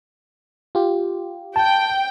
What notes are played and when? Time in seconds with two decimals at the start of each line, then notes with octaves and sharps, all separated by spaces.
0.75 F4 G4
1.56 G5 A5